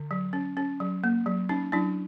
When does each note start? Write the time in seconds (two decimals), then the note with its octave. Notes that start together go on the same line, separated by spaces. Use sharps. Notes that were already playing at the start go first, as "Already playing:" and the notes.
Already playing: D3
0.11 F#3
0.33 C#4
0.57 C#4
0.80 F#3
1.04 A#3
1.26 F#3
1.49 C#4 D#4
1.72 F#3 D4 E4